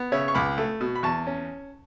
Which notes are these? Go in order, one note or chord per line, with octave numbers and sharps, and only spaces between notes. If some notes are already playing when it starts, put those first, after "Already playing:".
Already playing: B3
C#3 C#5 E5
C#6
C#2 B5 D6
A3
B2
B5
E2 A5 C#6
C#4